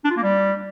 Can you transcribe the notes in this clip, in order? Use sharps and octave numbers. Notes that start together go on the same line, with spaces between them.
D4
F4
A#3
G3